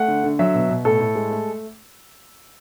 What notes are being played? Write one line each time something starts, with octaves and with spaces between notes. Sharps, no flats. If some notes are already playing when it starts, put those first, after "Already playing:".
Already playing: A3 F#5
D3
D3
F#3 E5
B2
B2
A2 A4
A2
G#3
A3